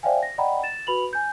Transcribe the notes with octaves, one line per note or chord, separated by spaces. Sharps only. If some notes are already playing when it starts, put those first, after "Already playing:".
C5 D5 E5 F5 G5 G#5
A#6
D5 D#5 F#5 G5 A#5 B5
A6 E7
F#4 B4 B5 F7 F#7
G#5 G6